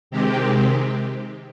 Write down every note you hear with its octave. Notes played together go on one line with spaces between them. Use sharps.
C3 D#3 G#3 C4 G4